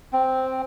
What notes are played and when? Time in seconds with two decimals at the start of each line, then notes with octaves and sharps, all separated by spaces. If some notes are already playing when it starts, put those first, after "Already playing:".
0.13 C4